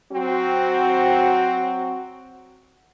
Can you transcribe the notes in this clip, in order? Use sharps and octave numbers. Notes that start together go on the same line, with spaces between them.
F#3 C4 F#4